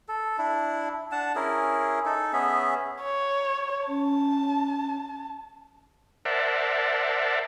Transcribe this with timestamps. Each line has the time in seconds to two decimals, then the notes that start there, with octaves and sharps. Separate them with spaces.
0.09 A4
0.38 D4 E4
1.12 D4 F#5 A5
1.35 C#4 E4 G#4 A#4
2.06 D#4 A4
2.33 B3 C#4 G#4 E5
3.03 C#5
3.88 C#4 A5
6.25 A#4 C5 D5 E5 F#5 A5